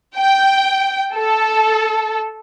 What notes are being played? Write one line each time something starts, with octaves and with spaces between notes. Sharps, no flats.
G5
A4